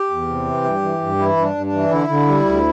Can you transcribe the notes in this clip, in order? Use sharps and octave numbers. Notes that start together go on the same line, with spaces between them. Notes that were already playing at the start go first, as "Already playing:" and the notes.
Already playing: G4
E2
C3
E3
G2
E3
G2
E3 E4
G2 D4
G2
D4
E3
D3 E4
D3
G3
D2